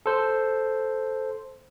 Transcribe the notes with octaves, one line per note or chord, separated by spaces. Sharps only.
A4 C5